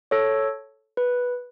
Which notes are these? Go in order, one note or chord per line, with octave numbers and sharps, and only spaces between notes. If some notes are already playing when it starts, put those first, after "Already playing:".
A4 C#5
B4